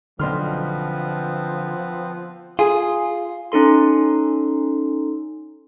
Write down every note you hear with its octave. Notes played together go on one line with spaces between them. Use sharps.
B1 D3 F3 B3 C4 B4 C6 F6
F4 G#4
C#4 D#4 A4 C6